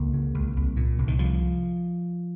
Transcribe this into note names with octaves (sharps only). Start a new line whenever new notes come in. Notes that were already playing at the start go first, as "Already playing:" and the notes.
Already playing: C#2 A#3
C#3
C#2
C2
A#2
C2
D#3
C2 F3